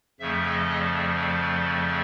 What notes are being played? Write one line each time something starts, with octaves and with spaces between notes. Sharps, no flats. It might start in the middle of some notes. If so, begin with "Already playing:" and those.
F2 C#3 F3 A3 E5
D#5
D5